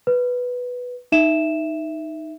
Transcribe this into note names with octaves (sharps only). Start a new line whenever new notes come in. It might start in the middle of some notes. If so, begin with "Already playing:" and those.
B4
D#4 E5 E7